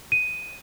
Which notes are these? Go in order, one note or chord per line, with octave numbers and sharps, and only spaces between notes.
D#7